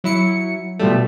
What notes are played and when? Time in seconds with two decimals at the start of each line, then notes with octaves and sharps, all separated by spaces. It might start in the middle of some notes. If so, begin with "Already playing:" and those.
0.04 F#3 E4 C#7
0.79 B2 F3 G3 A3